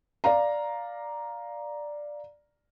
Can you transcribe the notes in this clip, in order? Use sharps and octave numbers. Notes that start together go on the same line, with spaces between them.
D5 F5 A#5